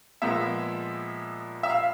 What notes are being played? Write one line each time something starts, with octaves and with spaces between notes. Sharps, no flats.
A#2 F3 G#3 B3 E5
E5
F5